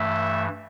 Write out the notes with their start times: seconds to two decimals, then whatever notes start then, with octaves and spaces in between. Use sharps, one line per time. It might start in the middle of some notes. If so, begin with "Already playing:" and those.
Already playing: G2 E3 A3 E5